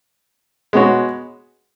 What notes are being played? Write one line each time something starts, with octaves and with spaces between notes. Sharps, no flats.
G#3 B3 F#4 C#5